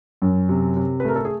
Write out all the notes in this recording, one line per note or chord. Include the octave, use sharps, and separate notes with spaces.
F#2
C3
C3
B4
A3 A#4
A4
G#4